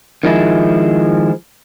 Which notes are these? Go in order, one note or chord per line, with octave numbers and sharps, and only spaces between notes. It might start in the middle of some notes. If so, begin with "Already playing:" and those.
D#3 F3 G#3 E4